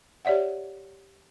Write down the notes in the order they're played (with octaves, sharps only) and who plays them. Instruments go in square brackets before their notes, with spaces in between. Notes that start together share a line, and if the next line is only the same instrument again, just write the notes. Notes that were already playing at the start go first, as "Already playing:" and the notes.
[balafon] G4 C#5 D5 E5 F#5